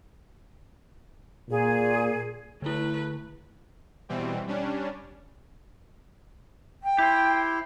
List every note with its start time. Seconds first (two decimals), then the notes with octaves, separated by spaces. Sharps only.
1.50 A#2 G#4
2.62 D3 A3 E4 B4
4.09 B2 E3 G3 C4
4.47 G3 C#4 D4
6.83 G5
6.98 E4 G4 C5